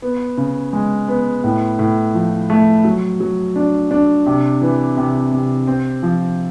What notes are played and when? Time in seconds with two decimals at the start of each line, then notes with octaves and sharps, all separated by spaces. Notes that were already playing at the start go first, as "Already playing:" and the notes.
0.02 B3
0.38 C#3
0.73 G#3
1.08 B3
1.44 A2
1.79 A2
2.14 F3
2.50 A3
2.85 F#3
3.20 F#3
3.56 D4
3.91 D4
4.26 C3
4.62 E3
4.97 C3
5.32 C3
5.67 C4
6.03 F3